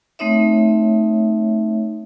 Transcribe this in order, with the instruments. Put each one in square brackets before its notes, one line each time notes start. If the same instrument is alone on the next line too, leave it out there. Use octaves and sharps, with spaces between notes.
[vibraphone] A3 C4 D#4 C#5 E5